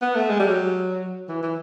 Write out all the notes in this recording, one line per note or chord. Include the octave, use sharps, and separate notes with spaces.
B3
A3
G#3
G3
F#3
E3
E3